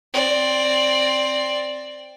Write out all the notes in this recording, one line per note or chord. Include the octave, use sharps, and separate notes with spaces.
C4 D5